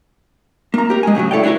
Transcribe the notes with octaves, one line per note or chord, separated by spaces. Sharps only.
A#3 A#5
G4 A#4
G#3 G#5
A2 C#3 E3 F#3
E4 A4 C#5 D5 G5
E4 F#4 G#4 A#4 B4